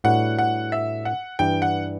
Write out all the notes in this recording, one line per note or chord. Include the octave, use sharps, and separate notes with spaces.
A2 G3 D4 F#4 B4 F#5
F#5
E5
F#5
G2 E3 G3 D4 G5
F#5